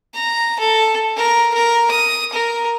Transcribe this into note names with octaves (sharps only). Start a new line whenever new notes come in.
A#5
A4
A#4
A#4
D#6
A#4